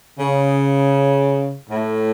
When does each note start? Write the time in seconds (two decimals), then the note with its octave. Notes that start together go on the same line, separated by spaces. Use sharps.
0.19 C#3
1.70 A2